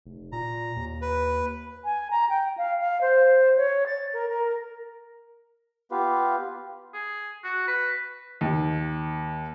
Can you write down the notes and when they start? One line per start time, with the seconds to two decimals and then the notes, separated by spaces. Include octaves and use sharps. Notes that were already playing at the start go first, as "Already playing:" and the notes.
0.06 F1
0.32 A#2 A#5
0.76 D#2
1.02 B4
1.84 G#5
2.11 A#5
2.29 G5
2.57 F5
2.80 F5
3.01 C5
3.57 C#5
3.86 A6
4.13 A#4
4.29 A#4
5.91 B3 F4 G4 B4 F5
6.94 G#4
7.44 F#4
7.67 B4
8.41 D#2